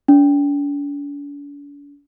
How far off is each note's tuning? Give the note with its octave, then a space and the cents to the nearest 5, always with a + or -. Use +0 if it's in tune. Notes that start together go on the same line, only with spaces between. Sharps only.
D4 -45